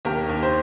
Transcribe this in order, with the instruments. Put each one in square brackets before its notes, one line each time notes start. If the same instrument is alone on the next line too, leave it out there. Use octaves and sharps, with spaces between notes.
[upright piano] D#2 G4 A#4
D#2
C5